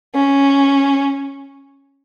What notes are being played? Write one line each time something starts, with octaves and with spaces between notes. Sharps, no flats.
C#4